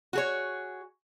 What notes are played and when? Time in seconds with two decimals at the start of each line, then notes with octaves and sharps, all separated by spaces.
0.13 F#4 G#4 C#5